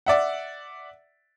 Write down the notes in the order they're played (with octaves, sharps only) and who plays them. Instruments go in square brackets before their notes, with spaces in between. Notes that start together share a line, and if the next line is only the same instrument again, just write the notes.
[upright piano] D5 E5 F#5